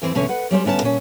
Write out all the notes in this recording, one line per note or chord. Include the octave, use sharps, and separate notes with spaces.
E2 E3 C4 C5
E2 B2 D3 C#4 C#5
B4 F#5
F#3 G3 C#4 C5
D2 B3 C#4 F#5 A5
A#2 C#4